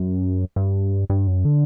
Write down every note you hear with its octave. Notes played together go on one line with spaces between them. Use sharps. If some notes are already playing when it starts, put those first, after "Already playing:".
Already playing: F#2
G2
G2
F#2
D3